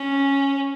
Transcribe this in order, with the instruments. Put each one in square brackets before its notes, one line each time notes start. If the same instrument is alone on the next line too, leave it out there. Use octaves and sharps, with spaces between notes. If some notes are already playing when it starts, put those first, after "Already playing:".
Already playing: [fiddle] C#4